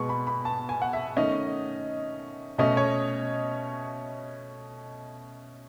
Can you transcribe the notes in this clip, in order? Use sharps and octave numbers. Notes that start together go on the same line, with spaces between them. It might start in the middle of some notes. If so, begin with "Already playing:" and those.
Already playing: B2 G#3 B3 C#6
B5
B5
A5
G#5
F#5
E5
D#3 A3 C#4 D#5
B2 A3 C#4 D#5
C#5